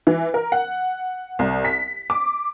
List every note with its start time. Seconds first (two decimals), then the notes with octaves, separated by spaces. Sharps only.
0.07 E3
0.34 A#4
0.52 F#5
1.39 C2
1.65 B6
2.10 D6